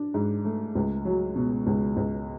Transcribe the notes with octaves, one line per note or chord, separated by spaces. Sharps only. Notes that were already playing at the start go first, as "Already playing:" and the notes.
Already playing: D4
G#2
A3
C#2
F#3
B2
C#2
C#2